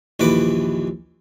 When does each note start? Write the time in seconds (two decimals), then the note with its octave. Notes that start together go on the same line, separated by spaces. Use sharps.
0.20 A#1 D#2 E3 B4 D6